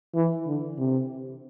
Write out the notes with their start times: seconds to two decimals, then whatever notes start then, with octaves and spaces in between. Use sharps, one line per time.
0.15 E3
0.47 D3
0.78 C3